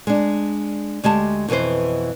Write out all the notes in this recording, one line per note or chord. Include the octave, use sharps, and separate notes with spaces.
G#3 D4
D2 G#3 G4 A5
F2 B2 E3 B4 C5